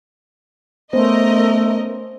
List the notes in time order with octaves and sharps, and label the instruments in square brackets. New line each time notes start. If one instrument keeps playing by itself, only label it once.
[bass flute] A3 [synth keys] B3 C#4 [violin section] A#4 D#5 [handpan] C5